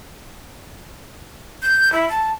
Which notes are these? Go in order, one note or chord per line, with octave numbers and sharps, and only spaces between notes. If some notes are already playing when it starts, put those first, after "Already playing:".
G6
E4
A5